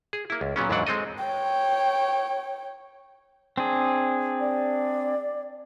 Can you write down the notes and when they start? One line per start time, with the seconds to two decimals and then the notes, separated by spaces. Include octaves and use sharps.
0.13 G#4
0.30 A#3 E4
0.41 C#2
0.56 A#2 F#3 B3 C#4
0.69 D#2 G#2 E3 F#3 D4 F#5
0.87 G#3 C4 A4 D#5
1.19 C#5 G5
3.58 C4 D4 G#4
4.40 D5